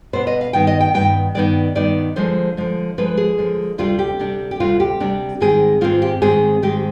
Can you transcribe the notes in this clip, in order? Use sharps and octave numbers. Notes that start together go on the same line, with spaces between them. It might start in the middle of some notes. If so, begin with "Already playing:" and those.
B2 B3 D4 C5
D#5
F5
G2 D#3 B3 D#4 G5
D#5
G5
G2 D#3 B3 D#4 G5
G2 D#3 B3 D#4 D5
G2 D#3 B3 D#4 D5
D3 F3 G#3 C5
D3 F3 G#3
D3 F3 G#3 B4
G#4
D3 F3 G#3
D2 C3 G3 D4 F4
G4
D2 C3 G3 D4
G4
D2 C3 G3 D4 F4
G4
D2 C3 G3 D4
G#2 D#3 G#3 C4 G#4
G#2 D#3 G#3 C4 F4
G4
G#2 D#3 G#3 C4 G#4
G#2 D#3 G#3 C4 G4